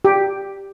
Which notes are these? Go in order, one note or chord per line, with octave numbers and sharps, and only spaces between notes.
G4